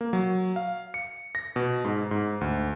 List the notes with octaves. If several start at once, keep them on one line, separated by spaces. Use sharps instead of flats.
A#3
F#3
F5
C#7
A#6
B2
G#2
G#2
D2